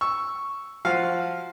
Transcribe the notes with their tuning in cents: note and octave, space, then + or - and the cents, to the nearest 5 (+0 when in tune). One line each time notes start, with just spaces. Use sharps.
C#6 +0 E6 +0
F3 +0 F#4 +0 F5 +0